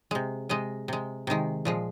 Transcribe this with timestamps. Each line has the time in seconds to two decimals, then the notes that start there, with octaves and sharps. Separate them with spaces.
0.11 C3 G#3
0.49 C3 G#3 D#5
0.88 C3 G#3
1.27 C3 D#3 G#3
1.65 A#2 F3 G#3